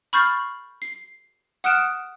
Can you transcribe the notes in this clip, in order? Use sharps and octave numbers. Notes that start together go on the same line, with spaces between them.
B5 C#6 F6 G6 A6 C7
C7
F#5 D#6 F6 F#6 D7 E7